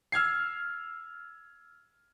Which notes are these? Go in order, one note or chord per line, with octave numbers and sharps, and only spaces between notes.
E6 F6 G#6 C7